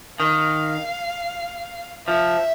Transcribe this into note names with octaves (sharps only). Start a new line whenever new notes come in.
D#3 F5
F3 E5